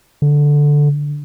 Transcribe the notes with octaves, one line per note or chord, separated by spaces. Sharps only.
D3